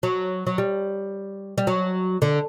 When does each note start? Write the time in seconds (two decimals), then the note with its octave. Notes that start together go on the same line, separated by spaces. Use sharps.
0.03 F#3
0.46 F#3
0.58 G3
1.58 G3
1.67 F#3
2.22 D3